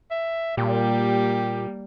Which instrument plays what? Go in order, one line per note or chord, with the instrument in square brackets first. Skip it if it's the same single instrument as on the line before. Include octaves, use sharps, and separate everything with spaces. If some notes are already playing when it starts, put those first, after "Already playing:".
[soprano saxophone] E5
[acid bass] A#2 [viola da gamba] G3 A#3 [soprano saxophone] G4